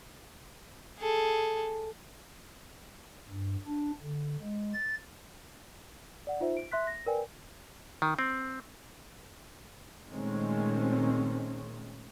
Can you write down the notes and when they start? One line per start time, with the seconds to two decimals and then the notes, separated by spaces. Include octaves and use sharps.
0.99 G#4 A4
3.29 G2
3.67 D4
4.02 D3
4.41 G#3
4.74 A6
6.27 D5 F#5
6.40 D#4 F4 C5 E5
6.57 D7
6.72 E5 C6 F#6 B6
6.87 A#6
7.06 A#4 B4 D5 G5 G#5
8.02 D#3
8.19 C4
10.09 A#2 D#3 G#3 A3 C4 C#4